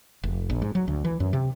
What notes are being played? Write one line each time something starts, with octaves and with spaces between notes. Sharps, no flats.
F1
A#1
G#2
F#3
D2
E3
F#2
C3